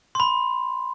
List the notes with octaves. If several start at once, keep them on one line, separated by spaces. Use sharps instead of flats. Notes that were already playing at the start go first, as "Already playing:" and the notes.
C6
B5